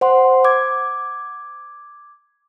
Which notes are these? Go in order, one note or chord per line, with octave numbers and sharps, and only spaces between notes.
C5 F#5 C6
D6 G#6